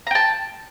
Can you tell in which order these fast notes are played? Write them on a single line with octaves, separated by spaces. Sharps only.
A#5 G5 A5